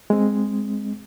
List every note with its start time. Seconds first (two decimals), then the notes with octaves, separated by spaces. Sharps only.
0.10 G#3 C4